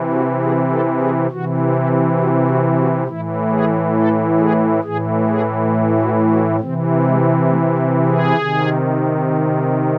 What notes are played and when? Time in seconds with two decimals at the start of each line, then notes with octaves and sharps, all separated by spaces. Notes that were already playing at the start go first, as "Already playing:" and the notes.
Already playing: C3 E3
0.13 F#4
0.43 G#4
0.72 A4
1.01 G#4
1.31 C3 E3 F#4
1.75 E4
2.19 F#4
2.49 F#4
2.78 F#4
3.07 A2 E3 E4
3.51 G#4
3.96 A4
4.39 G#4
4.84 A2 E3 G#4
5.28 G#4
6.01 F#4
6.31 F#4
6.60 C3 E3 C4
7.04 G#3
7.48 A3
7.78 E4
8.07 G#4
8.37 C3 D#3